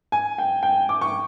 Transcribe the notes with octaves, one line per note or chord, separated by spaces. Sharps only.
G#5
G5
G5
D6
C#6